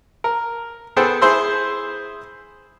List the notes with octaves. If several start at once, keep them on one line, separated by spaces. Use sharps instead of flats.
A#4
B3 G#4 A4 C5 G5 A5
E4 G#4 C5 C6 E6